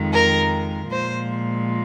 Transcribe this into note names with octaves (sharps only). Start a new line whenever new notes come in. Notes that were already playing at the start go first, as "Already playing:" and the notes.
Already playing: F2 D#3 G#3
A#4
A#2 F3 G#3 C5